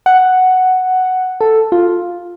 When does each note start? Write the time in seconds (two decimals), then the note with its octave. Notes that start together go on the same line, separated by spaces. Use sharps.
0.06 F#5
1.41 A4
1.72 F4